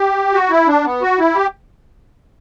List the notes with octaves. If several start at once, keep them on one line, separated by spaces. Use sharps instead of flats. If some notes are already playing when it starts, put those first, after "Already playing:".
Already playing: G4
F#4
E4
D4
B3
F#4
E4
G4